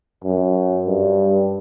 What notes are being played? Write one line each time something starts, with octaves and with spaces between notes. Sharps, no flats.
F#2
G2